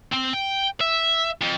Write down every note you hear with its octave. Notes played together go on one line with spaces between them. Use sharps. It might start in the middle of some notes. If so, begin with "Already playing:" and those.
C4
G5
E5
F2